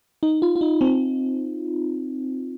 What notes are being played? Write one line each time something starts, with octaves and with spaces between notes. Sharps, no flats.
D#4
F4
F4
D#4
C4